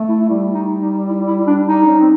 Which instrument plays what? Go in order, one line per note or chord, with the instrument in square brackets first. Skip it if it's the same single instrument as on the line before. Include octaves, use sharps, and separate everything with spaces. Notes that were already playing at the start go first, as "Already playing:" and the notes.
Already playing: [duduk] A3
[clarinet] E4
[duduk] G3 [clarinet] E4
[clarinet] D#4
D#4
E4
E4
D4
D#4
[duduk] C#4
C4